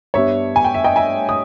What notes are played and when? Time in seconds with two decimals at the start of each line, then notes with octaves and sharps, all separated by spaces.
0.14 G2 G3 B3 C#5 E5
0.56 G#5
0.65 G5
0.74 E5
0.84 D#5 G5
0.96 E5 G#5
1.29 D#6